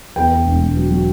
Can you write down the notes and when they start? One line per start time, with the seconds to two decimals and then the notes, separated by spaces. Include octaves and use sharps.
0.16 E2 G5
0.31 E2
0.46 E1
0.61 E1
0.76 F#3
0.90 F#3